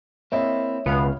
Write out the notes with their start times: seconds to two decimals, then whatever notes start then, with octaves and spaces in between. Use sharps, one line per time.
0.32 A#3 C4 E4 C#5 D#5 E5
0.86 C#2 B2 B3 F5